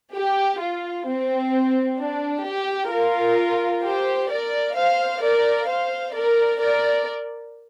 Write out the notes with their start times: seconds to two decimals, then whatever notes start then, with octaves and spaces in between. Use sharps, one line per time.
0.16 G4
0.61 F4
1.08 C4
1.99 D4
2.45 G4
2.91 F4 A#4
3.83 G4 C5
4.29 A#4 D5
4.75 C5 F5
5.21 A#4 D5
5.67 C5 F5
6.13 A#4 D5
6.59 A#4 D5